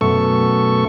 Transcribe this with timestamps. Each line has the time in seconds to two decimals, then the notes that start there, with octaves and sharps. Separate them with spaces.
0.01 F#2 B2 A3 A4 C#6